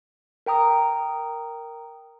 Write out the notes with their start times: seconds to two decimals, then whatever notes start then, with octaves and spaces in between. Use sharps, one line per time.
0.46 A#4 G5 A#5 D#6